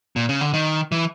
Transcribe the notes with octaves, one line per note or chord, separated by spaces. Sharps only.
A#2
C#3
D3
D#3
E3